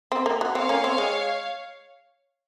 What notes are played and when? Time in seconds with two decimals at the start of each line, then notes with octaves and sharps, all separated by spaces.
0.12 C4
0.26 A#3
0.41 F#3
0.55 C4 C#5 F5
0.69 A#3 C#4
0.84 C4
0.98 G#3